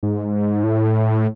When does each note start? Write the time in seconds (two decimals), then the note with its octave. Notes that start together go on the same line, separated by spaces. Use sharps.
0.03 G#2
0.64 A2